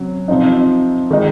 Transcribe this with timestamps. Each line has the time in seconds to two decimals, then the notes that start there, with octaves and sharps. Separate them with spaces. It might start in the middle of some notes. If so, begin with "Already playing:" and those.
Already playing: C3 F#3 C#4
0.28 C3 F3 C4 D#4
1.11 D#3 G#3 D#4